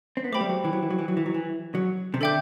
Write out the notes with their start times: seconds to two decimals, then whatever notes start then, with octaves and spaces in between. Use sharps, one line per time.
0.17 C4
0.24 B3
0.32 A3 G4 C5 G5 B5 D6
0.41 G3
0.49 F#3
0.65 E3
0.73 F#3
0.82 E3
0.90 F#3
0.99 E3
1.08 F#3
1.17 E3
1.26 F#3
1.34 E3
1.75 F#3
2.14 C3
2.21 D3 A4 E5 G5 D6 G6